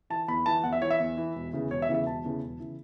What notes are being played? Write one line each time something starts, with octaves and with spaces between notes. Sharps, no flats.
E3 A5
E2 B5
E3 A5
E2 F#5
E5
E3 C#5
E5
E2
E3
E1
E2 C#3 E3
E1 C#5
E5
E2 C#3 E3
E5
E1 A5
E2 C#3 E3
E1
C#3 E3